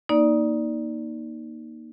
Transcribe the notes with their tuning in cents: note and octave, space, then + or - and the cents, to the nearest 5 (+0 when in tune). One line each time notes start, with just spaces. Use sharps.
A#3 +20 D#4 +0 D5 +0